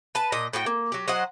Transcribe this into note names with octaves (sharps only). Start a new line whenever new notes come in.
B4 A5
A#2 D#5
A2 F#4 G4 G5
A#3
F#3 G4
F#3 C5 D#5 F#5